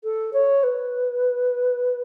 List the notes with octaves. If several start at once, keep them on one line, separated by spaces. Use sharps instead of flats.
A4
C#5
B4